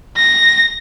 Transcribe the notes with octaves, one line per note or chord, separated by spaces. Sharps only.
A#6